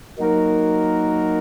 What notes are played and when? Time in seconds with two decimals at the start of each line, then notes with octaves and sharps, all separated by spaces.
0.18 F#3 A#3 D#4 F#4 A#4